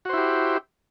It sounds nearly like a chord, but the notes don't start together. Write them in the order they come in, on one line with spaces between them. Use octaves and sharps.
F#4 C5 E4 G4